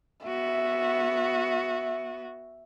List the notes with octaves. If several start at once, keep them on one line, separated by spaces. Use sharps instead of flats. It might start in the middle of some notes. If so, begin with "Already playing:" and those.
B3 F#4 E5